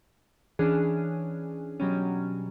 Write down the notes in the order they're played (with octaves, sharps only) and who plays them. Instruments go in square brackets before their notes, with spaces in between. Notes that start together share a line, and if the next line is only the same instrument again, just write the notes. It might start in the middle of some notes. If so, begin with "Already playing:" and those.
[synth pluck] E3 C#4 D4 G#4
B2 F#3 G3 C#4